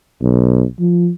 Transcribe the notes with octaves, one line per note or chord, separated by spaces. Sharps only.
B1
F3